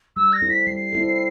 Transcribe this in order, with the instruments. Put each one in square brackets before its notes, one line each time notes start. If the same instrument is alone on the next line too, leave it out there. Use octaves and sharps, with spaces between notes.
[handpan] G3 [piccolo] E6
[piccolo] A#6
[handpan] C4 E4 A4
[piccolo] B6
[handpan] G3 [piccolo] C7
[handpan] C4 E4 A4